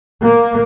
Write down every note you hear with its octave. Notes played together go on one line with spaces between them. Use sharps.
A#3